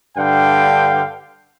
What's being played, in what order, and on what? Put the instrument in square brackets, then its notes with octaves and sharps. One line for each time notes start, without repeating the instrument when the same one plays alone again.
[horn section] G2 D3 F5 G5